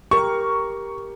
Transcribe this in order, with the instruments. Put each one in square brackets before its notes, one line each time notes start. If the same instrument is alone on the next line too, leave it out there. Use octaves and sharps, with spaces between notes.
[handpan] G4 A#4 [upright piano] C#6